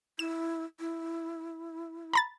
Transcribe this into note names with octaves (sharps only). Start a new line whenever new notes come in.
E4 E7
E4
A#5 B5 A6